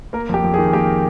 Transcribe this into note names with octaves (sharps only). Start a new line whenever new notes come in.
A#3 A#4
F2 G4
F2
G#4
D#3
A#3 G4